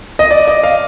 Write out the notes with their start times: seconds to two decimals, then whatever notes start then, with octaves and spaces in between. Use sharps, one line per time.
0.19 D#5
0.31 D5
0.48 D#5
0.63 F5